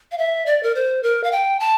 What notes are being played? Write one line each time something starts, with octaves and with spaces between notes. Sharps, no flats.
F5
E5
D5
A#4
C5
A#4
F5
G5
A5